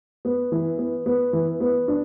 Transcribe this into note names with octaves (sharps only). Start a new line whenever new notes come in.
B3
E3
B3
B3
E3
B3
D4